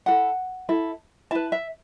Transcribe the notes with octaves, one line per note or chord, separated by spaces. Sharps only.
E4 A4 F#5
E4 A4
E4 B4 A5
E5